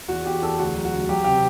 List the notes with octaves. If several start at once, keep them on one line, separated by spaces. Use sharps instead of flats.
E2 F#4
E2 G4
E2 A4
D2 F#4
F#3
F#4
D2
F#3 G4
C3 G4